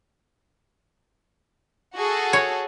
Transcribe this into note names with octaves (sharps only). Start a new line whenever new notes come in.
F#4 G#4 A4
C#5